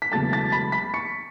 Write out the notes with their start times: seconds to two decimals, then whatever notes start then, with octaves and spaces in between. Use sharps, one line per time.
0.02 B6
0.12 E1 E2 C#3 F#3 A3 A5 A6
0.32 A5 A6
0.52 B5 B6
0.72 B5 B6
0.94 C#6 C#7